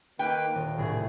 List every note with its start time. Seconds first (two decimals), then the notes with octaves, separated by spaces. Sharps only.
0.19 D#3 A#3 B4 G5 D6 F6 D#7
0.55 D#1 D3
0.78 C2 A2 D3 G#4